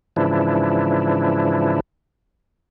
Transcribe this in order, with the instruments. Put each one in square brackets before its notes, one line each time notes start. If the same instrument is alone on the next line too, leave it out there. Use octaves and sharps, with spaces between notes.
[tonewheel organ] G#2 C#3 E3 F3 D4 E4